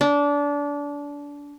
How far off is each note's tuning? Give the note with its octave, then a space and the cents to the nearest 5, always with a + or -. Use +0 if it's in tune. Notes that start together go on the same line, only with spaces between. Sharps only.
D4 -25